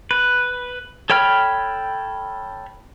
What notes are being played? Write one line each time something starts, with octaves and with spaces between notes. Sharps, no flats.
B4
A4 C#5 G5 B5 F6